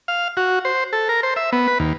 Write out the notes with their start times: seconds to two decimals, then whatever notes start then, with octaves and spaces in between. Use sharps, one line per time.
0.08 F5
0.37 F#4
0.65 C5
0.93 A4
1.09 A#4
1.23 C5
1.36 E5
1.52 B3
1.68 B4
1.80 D#2